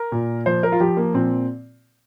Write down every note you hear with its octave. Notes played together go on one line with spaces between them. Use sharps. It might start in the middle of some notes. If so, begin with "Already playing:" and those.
Already playing: A#4
A#2
F3 C5
A#4
F4
F3 G4
A#3
A#2 C4